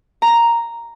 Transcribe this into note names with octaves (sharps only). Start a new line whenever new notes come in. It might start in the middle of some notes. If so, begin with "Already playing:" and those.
A#5